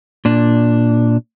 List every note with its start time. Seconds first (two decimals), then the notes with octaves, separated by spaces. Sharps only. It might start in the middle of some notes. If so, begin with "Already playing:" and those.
0.25 A#2 D4